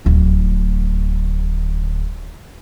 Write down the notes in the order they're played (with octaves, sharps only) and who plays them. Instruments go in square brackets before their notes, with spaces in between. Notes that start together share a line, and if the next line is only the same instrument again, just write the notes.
[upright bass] D1 D2